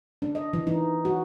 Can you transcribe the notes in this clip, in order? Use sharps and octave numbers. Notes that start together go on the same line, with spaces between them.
D4
D#5
E3
D#4
F#4